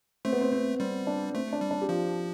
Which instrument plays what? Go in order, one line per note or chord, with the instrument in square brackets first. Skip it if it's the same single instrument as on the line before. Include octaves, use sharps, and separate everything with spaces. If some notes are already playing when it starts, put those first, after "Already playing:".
[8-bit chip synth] A3 [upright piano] C4
[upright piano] B3
C4
C4
[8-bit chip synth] G3 [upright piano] C4
[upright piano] D4
[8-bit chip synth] A3 [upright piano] C4
[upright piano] D4
[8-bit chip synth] G3
[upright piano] D4
G4
[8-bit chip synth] F3 [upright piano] F4